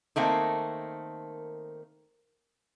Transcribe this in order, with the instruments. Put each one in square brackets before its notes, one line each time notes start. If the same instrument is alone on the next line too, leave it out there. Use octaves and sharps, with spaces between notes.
[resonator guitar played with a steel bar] D#3 A3 A#3 C4